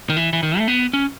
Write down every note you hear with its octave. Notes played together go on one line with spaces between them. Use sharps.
D#3
E3
E3
D#3
A3
B3
C#4